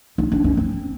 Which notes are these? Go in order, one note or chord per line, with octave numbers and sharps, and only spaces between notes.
D#4
D4
C#4
C4